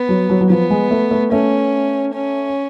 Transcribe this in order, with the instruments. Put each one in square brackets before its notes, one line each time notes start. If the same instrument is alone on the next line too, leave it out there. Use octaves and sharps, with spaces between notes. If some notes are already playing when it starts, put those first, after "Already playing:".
Already playing: [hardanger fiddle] B3
[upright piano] F#3
F#3
F#3
[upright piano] F3 [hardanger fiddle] B3
[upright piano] G#3
A3
A3
[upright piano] A3 [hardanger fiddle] C#4
[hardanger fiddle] C#4